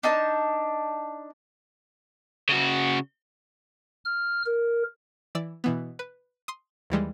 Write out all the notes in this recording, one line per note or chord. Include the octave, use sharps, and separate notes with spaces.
D4 D#4 A5
C#3 F#4
F6
A#4
E3 D5 E6
B2 E3 B3
B4
C6 D#6
D#2 E3 G3 G#3